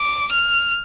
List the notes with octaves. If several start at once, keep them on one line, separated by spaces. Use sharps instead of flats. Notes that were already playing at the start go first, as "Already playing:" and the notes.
Already playing: D6
F6